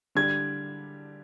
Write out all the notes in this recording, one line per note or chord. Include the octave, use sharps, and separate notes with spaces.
D3 G3 D4 G#6